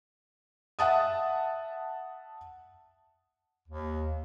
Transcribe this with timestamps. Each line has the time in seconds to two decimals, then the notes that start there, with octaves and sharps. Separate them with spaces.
0.79 E5 F#5 A5 D#6
3.69 D#2